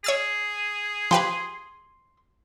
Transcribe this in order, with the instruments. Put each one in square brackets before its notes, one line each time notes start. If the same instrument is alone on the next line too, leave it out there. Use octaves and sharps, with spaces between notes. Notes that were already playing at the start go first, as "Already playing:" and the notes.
[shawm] G#4 [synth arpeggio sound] C#5 E6 A6
[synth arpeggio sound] F3 G4 B4 [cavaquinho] C6